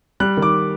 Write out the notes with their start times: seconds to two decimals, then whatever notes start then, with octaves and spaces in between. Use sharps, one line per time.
0.20 G3 F#6
0.37 D#3
0.42 D6